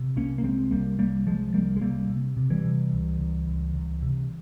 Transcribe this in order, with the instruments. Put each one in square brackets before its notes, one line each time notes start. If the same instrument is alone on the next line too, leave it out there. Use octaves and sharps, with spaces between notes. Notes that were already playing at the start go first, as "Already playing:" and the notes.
Already playing: [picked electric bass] C3
C2 A#3 C#4
A#3
C2 G#3 C4
C2 G3 A#3
C2 G3 A#3
C2 F3 G#3
C2 G3 A#3
G#3
C3 G3 A#3
C3
C3
E3 G3
C3
C#2
C#2
C#2
C#2
C3